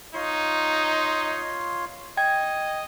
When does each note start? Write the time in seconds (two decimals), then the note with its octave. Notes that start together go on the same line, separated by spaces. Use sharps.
0.14 D#4 F4 C#5 C6
2.17 D#5 G5 G#6